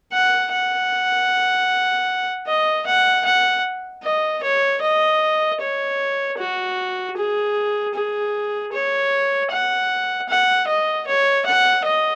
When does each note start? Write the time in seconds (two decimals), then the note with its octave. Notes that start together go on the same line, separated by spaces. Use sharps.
0.13 F#5
0.53 F#5
2.48 D#5
2.86 F#5
3.25 F#5
4.04 D#5
4.43 C#5
4.82 D#5
5.61 C#5
6.39 F#4
7.17 G#4
7.95 G#4
8.73 C#5
9.51 F#5
10.28 F#5
10.67 D#5
11.07 C#5
11.46 F#5
11.85 D#5